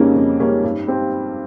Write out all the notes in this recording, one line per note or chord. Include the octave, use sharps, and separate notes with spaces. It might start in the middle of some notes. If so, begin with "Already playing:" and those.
Already playing: F2 C#3 G3 A#3 C#4 D#4
F2
C#3 G3 A#3 C#4
G2
G3 C4